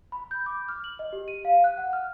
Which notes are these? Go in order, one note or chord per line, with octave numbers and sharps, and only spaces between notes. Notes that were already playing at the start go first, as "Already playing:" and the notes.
B5
G6
D6
F6
F#7
D#5
G4
D#7
F5
F#6
F#5
F6